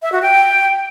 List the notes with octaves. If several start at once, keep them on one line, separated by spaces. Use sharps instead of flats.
E5
F#4
G5